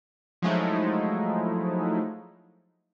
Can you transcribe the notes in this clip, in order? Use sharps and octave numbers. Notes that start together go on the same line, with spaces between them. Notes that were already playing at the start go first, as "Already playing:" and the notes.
F3 F#3 G#3 A3 D#4 E4